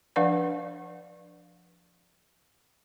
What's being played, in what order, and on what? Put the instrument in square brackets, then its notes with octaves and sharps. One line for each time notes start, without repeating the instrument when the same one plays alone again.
[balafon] F3 D4 B4 D5 F5 F#5